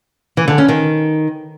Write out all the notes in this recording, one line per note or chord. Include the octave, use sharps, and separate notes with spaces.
E3
D3
C#4
D#3